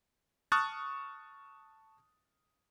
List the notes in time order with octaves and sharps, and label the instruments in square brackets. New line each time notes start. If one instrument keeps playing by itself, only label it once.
[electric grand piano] A5 C#6 D#6 F6 F#6 A6